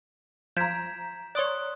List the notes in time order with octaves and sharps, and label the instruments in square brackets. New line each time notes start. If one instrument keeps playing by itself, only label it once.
[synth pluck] F3 [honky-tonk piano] A#5 D7 [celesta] G6 G#6 B6 [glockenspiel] E7
[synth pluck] C#5 D5 [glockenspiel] C6 D#6 F#6